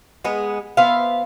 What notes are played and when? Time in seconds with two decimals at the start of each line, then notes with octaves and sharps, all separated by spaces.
0.25 G#3 B3 G#4
0.77 B3 C5 E5 F5